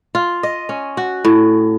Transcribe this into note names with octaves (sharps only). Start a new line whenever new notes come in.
F4
D#5
C#4
F#4
A2